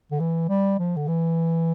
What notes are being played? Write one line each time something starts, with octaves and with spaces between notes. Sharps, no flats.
D3
E3
G3
F3
D3
E3